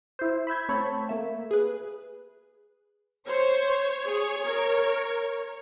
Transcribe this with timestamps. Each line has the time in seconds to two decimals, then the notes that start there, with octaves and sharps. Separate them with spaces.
0.19 E4 C5
0.47 B5 E6 G6 G#6
0.69 A3 C4 C#5 A5 B5
1.09 A3 A#3 E5
1.51 G#4 B4
3.27 C5 C#5
4.07 G#4
4.46 A#4